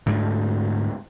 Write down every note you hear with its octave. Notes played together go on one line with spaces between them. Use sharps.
D2 G#2 G#3 A3